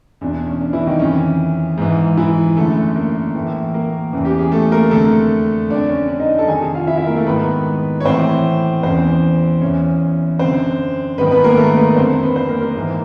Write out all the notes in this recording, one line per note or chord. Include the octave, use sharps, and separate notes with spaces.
E2 B2 D4
D4
C#4
D4
E3 E4
D#3 D#4
F2 C#3 E3 C#4
G#2 E3
E3 E4
F#2 D3 A3 A4
A#3 A#4
A2 E3
A#3 A#4
E2 C#3 E3
G4
G#4
A3 A4
A#3 A#4
F2 D3 A3 A4
F2 D3 D4 D5
C#4 C#5
D4 D5
D#4 D#5
A4 A5
F2 C3 D#3 G#4 G#5
G#4 G#5
F4 F5
E4 E5
E4 E5
A#3 A#4
A3 A4
G#2 D#3 B3 B4
C#5
A2 E3 C4 C5
E2 C#3 E3 C4 C5
E2 C#3 E3 C#4 C#5
F#2 C4 C5
D3
G#2 D#3 B3 B4
B3 B4
A#3 A#4
A3 A4
B3 B4
F2 D3 C4 C5
B3 B4
C4 C5
A#3 A#4
A#3 A#4
G#2 E3